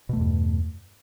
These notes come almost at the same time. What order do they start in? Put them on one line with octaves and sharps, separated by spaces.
B2 A3 E2 G2